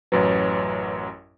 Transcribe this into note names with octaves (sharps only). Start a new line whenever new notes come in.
A1 F#2 F#3 B4 C#5